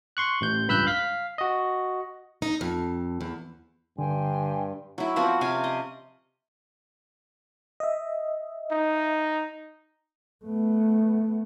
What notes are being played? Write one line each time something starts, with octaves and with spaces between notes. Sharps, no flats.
C6 C#6 F#6
A1 G6
C#2 G2 B5 E6 F#6 G6
F5 B6
F#4 D#5
D#4
F2
E2
G2 D3 G5 G#5 C6
F#3 E4
F3 B3 C4 F#4
C3 C#4 F5 G#5
D#5
D#5 E5
D#4
A3 B3